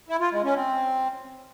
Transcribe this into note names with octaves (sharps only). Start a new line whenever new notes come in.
E4
F4
G#3
C#4
C4